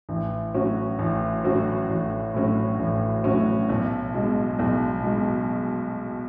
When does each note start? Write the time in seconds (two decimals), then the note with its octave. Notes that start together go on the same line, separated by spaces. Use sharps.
0.09 A1
0.54 A2 F#3 C#4 F#4
0.99 A1
1.44 A2 F#3 C#4 F#4
1.90 A1
2.34 A2 F#3 C#4 F#4
2.79 A1
3.24 A2 F#3 C#4 F#4
3.69 B1
4.14 B2 G#3
4.59 B1
5.04 B2 G#3